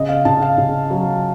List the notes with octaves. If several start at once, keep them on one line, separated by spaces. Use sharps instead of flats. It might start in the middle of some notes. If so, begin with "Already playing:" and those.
Already playing: C#3 D#5
F5
C#3 A5
F5
C#3
F#3